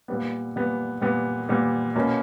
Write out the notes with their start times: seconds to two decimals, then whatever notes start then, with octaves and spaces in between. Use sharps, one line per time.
0.08 A#2 G3 B3
0.56 A#2 G3 B3
1.01 A#2 G3 B3
1.49 A#2 G3 B3
1.96 B2 A#3 C#4